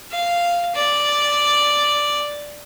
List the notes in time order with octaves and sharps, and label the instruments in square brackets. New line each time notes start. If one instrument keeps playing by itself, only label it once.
[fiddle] F5
D5